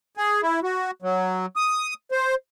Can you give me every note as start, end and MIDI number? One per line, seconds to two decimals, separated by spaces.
0.17 0.41 68
0.42 0.60 64
0.63 0.91 66
1.02 1.46 54
1.56 1.94 87
2.12 2.35 72